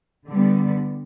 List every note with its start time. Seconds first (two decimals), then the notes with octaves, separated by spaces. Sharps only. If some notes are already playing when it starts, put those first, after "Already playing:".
0.28 D3 G3 B3